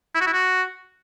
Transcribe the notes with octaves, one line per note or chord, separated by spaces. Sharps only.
E4
F#4
E4
F#4